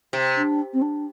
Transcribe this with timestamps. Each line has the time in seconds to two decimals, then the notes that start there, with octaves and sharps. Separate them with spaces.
0.13 C3
0.36 D4
0.73 C4
0.82 D4